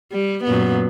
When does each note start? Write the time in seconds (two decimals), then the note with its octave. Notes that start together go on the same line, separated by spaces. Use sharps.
0.13 G3
0.44 F#2 A#2 B3